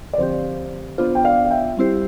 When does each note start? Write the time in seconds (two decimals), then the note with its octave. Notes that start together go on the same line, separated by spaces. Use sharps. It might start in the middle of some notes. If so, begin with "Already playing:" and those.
0.13 D5
0.18 D3 F3 C4 G4 C5
0.98 B3 D4 F4 C5
1.15 G5
1.24 D5 F5
1.45 F5
1.51 E5 G5
1.77 G3 C4 E4 G4 C5